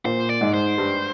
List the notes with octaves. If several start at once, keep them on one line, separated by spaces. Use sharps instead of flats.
A#2 A#3 C5
D5
G#2 G#3
C5
G2 G3